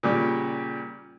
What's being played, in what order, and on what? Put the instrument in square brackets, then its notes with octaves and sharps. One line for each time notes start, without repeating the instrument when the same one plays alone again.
[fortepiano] A#2 C#3 G3 G4